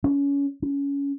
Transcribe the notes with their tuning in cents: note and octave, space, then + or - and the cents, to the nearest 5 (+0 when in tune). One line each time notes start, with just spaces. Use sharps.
C#4 +25
C#4 +20